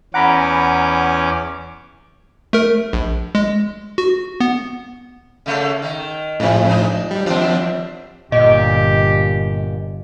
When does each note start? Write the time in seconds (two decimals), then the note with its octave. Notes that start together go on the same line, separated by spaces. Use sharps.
0.14 E2 C#4 F#5 A#5 B5 D6
2.53 A3 A#4
2.93 A#1
3.35 G#3
3.98 F#4
4.40 B3
5.46 C#3 A3 A#3
5.82 D#3
6.40 A2 C3 F3
6.69 D4 D#4 D#5
7.11 G3
7.26 D#2 F3 C4 D4
8.32 G1 A#2 G4 D#5